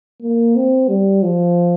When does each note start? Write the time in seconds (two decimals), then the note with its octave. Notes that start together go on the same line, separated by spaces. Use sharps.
0.22 A#3
0.56 C4
0.88 G3
1.23 F3